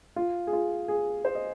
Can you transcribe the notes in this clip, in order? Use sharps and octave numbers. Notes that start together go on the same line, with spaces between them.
F4
G#4
F4
G#4
C5
D#5